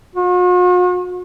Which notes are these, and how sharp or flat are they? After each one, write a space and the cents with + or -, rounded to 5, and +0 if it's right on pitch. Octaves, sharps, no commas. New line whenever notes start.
F#4 -45